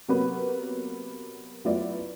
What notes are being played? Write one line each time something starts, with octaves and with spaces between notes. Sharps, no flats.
C3 F#3 A#3 B3 F#4 B4
F#3 A3 B3 E4 F4 D5